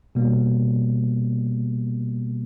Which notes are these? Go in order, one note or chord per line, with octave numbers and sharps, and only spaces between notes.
B2 G3 A#3